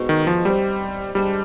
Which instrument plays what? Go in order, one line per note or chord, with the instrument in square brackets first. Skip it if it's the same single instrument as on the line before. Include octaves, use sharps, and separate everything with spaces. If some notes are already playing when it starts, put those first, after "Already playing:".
Already playing: [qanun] B2 G#3 C4 D#4
[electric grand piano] D#3
F3
[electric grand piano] G3 [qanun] C4 G4 C5 D#5
[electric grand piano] G3 [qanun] G#3 D4 G4 C5